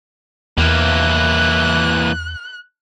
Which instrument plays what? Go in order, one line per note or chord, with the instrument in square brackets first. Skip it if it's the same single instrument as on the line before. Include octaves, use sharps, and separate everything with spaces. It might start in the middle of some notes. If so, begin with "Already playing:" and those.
[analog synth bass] E2 [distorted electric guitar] E3 A#3 [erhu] F#6